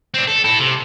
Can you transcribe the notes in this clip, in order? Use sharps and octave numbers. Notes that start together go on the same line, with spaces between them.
C4 D4
A4
E4 A4
C3